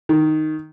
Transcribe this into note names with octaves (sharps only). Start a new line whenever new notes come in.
D#3